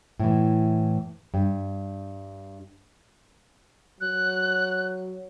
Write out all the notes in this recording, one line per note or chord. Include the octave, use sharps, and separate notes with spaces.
A2 E3
G2
F#3 F#6